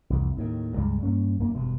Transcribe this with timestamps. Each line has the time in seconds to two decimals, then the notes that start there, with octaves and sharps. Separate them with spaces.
0.10 C2 F2 E3
0.37 D#2 A2 D#3
0.75 C#2 G2 G3 G#3
1.03 G2 A#3 C#4
1.39 F#2 A#3 D4
1.54 E1 G2 B2